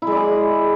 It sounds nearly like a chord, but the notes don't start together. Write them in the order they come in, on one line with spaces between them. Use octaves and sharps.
E4 G#3 D5 G#4